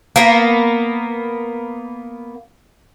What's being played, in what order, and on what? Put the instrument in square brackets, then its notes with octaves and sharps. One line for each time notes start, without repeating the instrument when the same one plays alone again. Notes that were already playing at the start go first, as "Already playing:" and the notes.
[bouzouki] A#3 B3